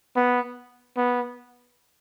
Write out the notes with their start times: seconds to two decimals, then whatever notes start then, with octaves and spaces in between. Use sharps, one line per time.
0.16 B3
0.97 B3